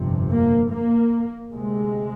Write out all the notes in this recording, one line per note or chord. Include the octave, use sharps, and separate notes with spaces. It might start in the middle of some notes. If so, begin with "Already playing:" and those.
Already playing: G1 F2 C3
A#3
A#3
D2 C3 G#3